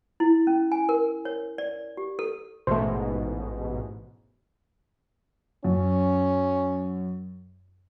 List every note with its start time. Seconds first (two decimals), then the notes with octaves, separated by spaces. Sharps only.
0.20 E4
0.47 C#4
0.72 G#5
0.89 A#4
1.25 C#5
1.58 D5
1.97 G4
2.19 A4
2.67 A1 G#2 B2 A3 C5
5.64 F#2 C#4